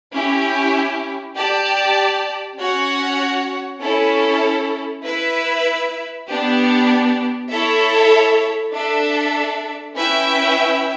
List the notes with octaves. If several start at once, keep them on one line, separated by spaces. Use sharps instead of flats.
C#4 E4 G4
G4 D5 A5
C#4 F#4 C#5 F#5
C#4 E4 A4
E4 B4 E5
B3 D4 G4
E4 A4 C#5 E5
D4 A4 E5
C#4 E4 B4 E5 G5